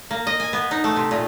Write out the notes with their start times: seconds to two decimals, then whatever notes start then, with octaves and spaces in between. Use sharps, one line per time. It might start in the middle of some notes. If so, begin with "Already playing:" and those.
0.11 A#3
0.27 D#5
0.40 G#5
0.53 B3
0.71 D#4
0.84 A3
0.96 C3
1.11 A#2